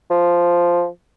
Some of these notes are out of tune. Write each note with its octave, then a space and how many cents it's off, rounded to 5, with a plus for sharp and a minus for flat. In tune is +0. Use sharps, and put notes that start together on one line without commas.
F3 -5